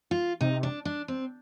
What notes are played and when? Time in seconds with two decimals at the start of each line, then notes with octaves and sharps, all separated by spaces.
0.11 F4
0.41 C3 D#4
0.63 D4
0.85 D4
1.08 C4